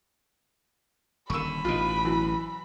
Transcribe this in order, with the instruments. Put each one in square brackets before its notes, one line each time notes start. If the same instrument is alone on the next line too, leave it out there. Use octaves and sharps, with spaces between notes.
[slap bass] D#1 D3 [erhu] B5 [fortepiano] C#6 E6
[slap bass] A1 B2 [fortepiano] D#4 F4
[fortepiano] E3 F#3